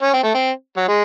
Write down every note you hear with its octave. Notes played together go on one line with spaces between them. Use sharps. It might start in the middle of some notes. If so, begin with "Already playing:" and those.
C#4
C4
A3
C4
F#3
G#3